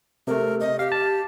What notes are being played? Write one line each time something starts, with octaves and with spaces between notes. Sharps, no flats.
C3 A3 A#4
D#5
G4 F5
A5